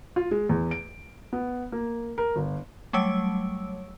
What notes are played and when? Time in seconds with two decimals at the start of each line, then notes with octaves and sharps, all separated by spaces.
0.16 F4
0.31 G#3
0.49 E2
0.71 D7
1.33 B3
1.72 A#3
2.18 A#4
2.36 G1
2.93 F#3 G3 A3 C#5 E6 D7